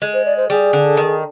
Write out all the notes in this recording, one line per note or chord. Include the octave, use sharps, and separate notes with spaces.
G#3
C5
D5
C5
G3 G#4
D3
D#3